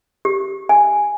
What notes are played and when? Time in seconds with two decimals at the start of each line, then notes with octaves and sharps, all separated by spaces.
0.25 G4
0.69 G#5